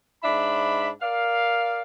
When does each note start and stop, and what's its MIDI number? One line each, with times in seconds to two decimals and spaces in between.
0.23 0.90 44
0.23 0.90 62
0.23 0.90 76
0.23 0.90 83
1.02 1.82 70
1.02 1.82 74
1.02 1.82 77